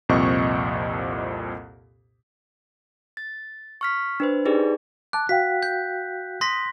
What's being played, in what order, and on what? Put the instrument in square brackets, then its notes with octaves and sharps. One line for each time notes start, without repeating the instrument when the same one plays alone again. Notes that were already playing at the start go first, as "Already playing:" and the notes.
[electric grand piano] C2 F2 A#2 C4 D#5 C#6
[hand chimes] A6
C#6 F6 B6
D4 B4 C5
D#4 G4 G#4 B4 D5
[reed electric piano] A5 D6 [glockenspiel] F#6
[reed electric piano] F#4 F5 G5 [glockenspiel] B6
[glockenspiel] G6
[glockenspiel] C6 A#6 B6 [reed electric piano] D#6